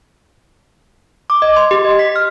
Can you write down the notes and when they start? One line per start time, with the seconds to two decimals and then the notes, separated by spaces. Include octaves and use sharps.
1.30 D6
1.42 D#5
1.57 C6
1.71 G4
1.85 D#5
1.99 B6
2.16 F6